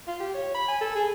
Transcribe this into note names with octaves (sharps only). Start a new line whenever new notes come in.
F4
G4
C#5
B5
G#5
A4
G#4